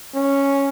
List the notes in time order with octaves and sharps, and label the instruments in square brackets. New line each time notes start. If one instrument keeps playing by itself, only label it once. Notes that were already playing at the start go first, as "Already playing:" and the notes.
[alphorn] C#4